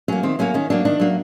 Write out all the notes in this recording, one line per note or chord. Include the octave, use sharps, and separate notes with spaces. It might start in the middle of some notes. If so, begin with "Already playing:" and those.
F#3 A#3 C#4
D#3 C4
F#3 A#3 C#4
D#3 C#4
F#3 A#3 D4
D#3 D4
F#3 A#3